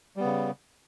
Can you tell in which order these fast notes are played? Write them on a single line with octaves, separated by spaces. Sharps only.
G3 B3 C#3